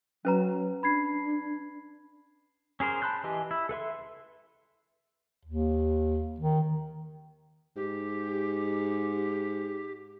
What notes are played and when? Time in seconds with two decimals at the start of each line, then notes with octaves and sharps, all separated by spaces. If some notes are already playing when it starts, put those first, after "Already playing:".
0.25 F#3 C#4 B4 A#5
0.83 D4 B5 G#6 C7
2.80 C#4 G#4 A#4 C5
3.02 A5 B5 C6 F#6 G6
3.24 E3 G4 B4 D#5 G#5
3.51 E4
3.69 A4 B4 E5 C6
5.45 D#2
6.40 D#3
7.76 G#2 G4